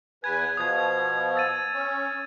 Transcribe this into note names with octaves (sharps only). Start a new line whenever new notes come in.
E2 B4 G#5 G#6
B2 F3 D#6 G#6
E6 A6 D#7
C#4